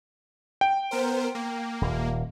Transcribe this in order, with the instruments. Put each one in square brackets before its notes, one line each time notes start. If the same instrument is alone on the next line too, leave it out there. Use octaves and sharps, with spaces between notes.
[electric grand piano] G5
[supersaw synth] B3 A#4 C5
A#3
[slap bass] D#1